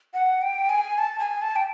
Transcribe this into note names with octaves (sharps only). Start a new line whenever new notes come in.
F#5
G5
G#5
A5
G#5
A5
G5